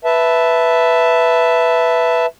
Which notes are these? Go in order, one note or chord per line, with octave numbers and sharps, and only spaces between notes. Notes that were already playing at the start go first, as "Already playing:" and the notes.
B4 E5 A5